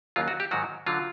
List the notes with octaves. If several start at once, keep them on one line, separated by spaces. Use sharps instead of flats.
D#2 C#3 F#3 F4
F#4
G4
G#2 D#3 F#3 F#4
D3 F#3 F4